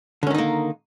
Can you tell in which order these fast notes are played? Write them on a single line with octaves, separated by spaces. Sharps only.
D3 C#4 D#3 D#4 A#3